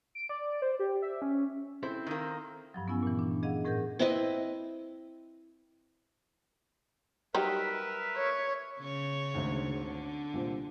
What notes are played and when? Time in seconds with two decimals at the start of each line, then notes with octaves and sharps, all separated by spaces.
0.15 D7
0.29 D5
0.62 C5
0.79 G4
1.02 E5
1.22 C#4
1.83 C4 E4 A4 C5
2.07 D#3 A#3
2.74 G2 F3 F#3
2.88 B3 C#4 E4 G#5
3.03 A#2 E3
3.19 D4
3.43 G#4 D#5 F5 F#5
3.65 A2 G#4 A#4 F#5 G6
3.99 C4 E4 B4 D#5
7.34 F#3 G3 D#4 A#4 B4 E5
8.16 C#5
8.81 C#3 C#5
9.34 G#1 D2
9.78 D3
10.33 C2 A#2 C5